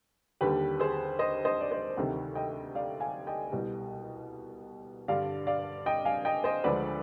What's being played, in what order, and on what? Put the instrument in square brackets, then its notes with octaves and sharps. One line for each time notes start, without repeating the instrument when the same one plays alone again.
[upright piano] D#2 D3 G3 G4 B4
G#4 C5
C5 D#5
C5 D#5
D5
C5 D#5
D2 C3 D#3 G3
D#5 G5
D5 F5
F5 G#5
D#5 G5
C2 B2 G3
G2 D3 G3 D5 F5
D5 F5
D#5 G5
F5 G#5
D#5 G5
C5 D#5
D2 D3 F3 G#3 B4 D5